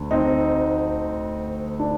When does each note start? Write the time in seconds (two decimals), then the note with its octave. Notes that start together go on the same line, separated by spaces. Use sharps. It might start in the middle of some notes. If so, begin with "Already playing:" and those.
Already playing: D2 D3
0.11 C4 D#4
1.80 D4